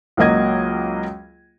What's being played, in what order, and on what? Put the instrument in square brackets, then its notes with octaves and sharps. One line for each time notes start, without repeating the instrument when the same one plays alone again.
[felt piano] C#2 F#3 A#3 D#5 G#6